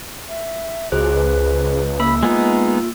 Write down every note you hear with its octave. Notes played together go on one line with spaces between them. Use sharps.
E5
C#2 F#4 G#4 C5 F#6
B4
A#3 B5 E6
G#3 B3 D#4 F4